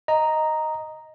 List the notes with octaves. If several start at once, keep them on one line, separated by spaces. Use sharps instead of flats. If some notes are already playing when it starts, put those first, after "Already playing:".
D#5 A#5